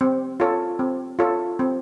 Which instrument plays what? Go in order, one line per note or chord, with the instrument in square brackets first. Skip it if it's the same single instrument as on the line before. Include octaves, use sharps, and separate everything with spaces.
[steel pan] C4
F4 A4 C#5
C4
F4 A4 C#5
C4